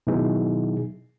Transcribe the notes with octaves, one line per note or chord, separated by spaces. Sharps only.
B2 D#3 F#3 D#4 E4 G#4